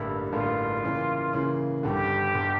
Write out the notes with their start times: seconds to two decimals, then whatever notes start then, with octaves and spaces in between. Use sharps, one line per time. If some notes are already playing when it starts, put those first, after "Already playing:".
Already playing: A1 G2 D3 G3 A#3 E4
0.32 A1 G2 D3 G3 A#3 F4
0.84 C#3 E3 A#3
1.33 C#3 E3 A#3
1.83 G1 G2 D3 G4
2.34 G1 G2 D3